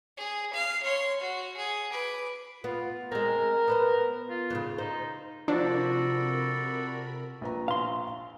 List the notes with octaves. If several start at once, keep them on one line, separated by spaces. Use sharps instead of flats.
G#4
F5
C#5 C6
F#4
G#4
B4 D6
B3 F4
G#3 C4 A#4
B3 B4 C5
F4
F2 G#2 C#3
D#4 C5
C3 F3 D4 F#4 A4 A#4 D5 B5
A#1 B4 A#5
F5 C6